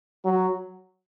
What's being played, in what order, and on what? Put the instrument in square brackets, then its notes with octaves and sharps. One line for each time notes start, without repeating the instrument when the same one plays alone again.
[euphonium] F#3